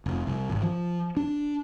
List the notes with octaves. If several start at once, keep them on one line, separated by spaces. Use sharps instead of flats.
F1
C2
G#1
F3
D4